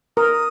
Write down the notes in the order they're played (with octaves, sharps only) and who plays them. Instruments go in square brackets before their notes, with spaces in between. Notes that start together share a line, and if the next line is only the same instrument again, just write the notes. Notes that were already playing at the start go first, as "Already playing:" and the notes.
[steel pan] A#4 [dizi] D#6